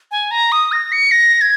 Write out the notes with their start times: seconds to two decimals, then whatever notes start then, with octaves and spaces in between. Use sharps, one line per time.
0.11 G#5
0.31 A#5
0.52 D#6
0.72 A#6
0.92 C#7
1.11 A#6
1.41 G#6